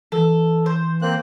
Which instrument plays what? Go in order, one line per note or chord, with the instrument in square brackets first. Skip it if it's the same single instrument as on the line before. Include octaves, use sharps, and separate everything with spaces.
[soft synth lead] E3 [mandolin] A4
[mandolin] C5
[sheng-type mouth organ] A#3 C4 F#6